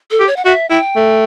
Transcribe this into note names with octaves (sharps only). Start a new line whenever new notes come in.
A4
G4
C#5
F#5
F#4 E5
E4 G5
A3